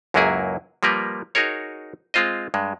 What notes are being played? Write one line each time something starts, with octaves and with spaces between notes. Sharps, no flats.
C#2 F#2 F#3 A#3 E4 G#4
F3 G3 A#3 A#4 B4
D#4 F#4 G#4 A#4 C#5
G#3 C4 F4 C5 D#5
G2 G#3